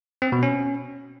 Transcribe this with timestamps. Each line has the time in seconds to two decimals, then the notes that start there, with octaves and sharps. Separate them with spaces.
0.22 C4
0.32 B2
0.43 C#4